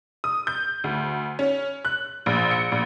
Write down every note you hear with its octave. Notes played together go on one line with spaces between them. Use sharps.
D#6
G6
D2
C#4
F#6
A#1
C#7
A#1